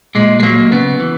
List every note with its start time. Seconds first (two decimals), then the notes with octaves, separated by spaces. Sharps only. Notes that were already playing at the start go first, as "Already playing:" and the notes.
0.15 A#2 G#3
0.40 G#3
0.43 F#3 A#3
0.72 C#3 B3
1.00 E3